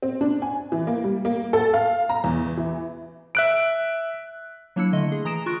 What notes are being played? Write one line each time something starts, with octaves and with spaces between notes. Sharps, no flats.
C4
D4
G#5
E3
A#3
G3
A#3
A4
F5
A#5
E2
E3
E5 F#6 D7
F#3 A#3 D4 E4 E6 C#7
D3 A3 D#5 C6
G#4
E3 A#5 D#6 A#6 D7 E7
F4 C#6 F#6 A#6 D7